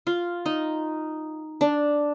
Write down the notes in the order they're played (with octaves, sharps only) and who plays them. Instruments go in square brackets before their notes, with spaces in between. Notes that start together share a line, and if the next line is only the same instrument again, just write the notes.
[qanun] F4
D#4
D4